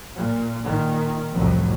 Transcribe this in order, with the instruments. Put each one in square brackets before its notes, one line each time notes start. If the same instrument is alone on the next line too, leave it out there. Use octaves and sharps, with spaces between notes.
[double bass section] A#2
A#2 D#3
C2 F2 A2 F#3